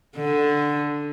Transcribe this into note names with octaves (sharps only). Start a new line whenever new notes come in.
D3